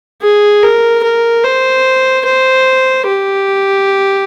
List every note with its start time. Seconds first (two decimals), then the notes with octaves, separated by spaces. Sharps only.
0.22 G#4
0.63 A#4
1.03 A#4
1.45 C5
2.25 C5
3.07 G4